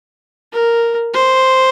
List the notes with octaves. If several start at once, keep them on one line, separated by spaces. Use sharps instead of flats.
A#4
C5